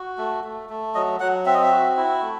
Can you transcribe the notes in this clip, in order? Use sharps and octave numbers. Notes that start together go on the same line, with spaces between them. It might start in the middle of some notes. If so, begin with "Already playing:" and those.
Already playing: F#4
A3
A3
A3
F#3 D#5
F#3 F#5
C4 E5
D#5
E5
F#4
E4
A3